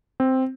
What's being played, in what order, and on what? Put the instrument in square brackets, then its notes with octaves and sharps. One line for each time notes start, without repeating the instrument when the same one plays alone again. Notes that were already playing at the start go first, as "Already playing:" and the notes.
[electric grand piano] C4